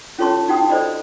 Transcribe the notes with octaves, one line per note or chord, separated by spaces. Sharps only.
C#4 F4 A4 C#5 A5 C6
D#4 F#4 G5 D#6
A4 C5 D5 D#5 B5